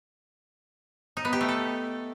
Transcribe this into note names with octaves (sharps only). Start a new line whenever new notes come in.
D#4
B3
G4
A3
A4